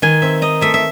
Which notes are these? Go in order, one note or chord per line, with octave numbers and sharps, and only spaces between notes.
D#3 G#5
C4 E5
D#4 D#5
A3 E5
E5